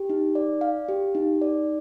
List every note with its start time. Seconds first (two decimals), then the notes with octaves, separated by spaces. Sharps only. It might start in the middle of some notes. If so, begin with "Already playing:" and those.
Already playing: G4
0.10 D#4
0.35 D5
0.61 F5
0.89 G4
1.15 D#4
1.41 D5